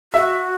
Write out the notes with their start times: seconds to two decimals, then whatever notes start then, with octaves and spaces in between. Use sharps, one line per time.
0.13 F#4 E5